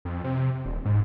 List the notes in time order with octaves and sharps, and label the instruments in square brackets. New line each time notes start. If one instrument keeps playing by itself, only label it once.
[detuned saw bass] F2
C3
D#1
G#2